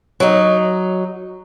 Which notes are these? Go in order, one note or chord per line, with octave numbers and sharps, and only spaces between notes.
F#3 D#4